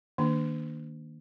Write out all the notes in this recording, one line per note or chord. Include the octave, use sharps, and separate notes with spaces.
D#3 A#3 D4